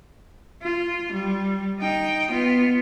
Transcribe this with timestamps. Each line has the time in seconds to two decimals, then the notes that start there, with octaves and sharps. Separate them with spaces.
0.62 F4
1.12 G3
1.79 D#4 G5
2.31 B3 F4